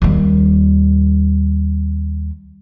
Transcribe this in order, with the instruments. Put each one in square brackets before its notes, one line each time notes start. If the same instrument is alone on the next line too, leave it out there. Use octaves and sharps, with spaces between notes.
[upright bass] D#2 G3